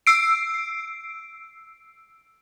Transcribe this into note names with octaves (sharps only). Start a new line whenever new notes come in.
E6 C7 D7